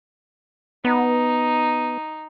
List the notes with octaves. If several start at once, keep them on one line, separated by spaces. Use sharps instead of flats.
B3 D#4